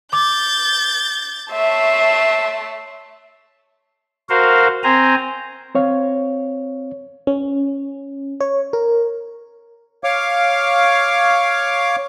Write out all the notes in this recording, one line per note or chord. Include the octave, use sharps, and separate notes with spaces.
D6 G6 A6
A3 C#5 E5 A5 C6
F#4 A#4 C5 F5
C4 C5 G#5 A#5
C4 C#5 F5
C#4
C#5
A#4
C#5 F5 D6